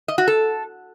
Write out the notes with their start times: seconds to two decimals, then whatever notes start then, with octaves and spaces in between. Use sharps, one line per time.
0.08 D#5
0.18 F#4
0.28 A4